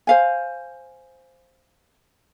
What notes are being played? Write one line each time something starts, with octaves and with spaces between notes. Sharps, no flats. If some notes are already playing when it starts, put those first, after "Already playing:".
C5 F5 G#5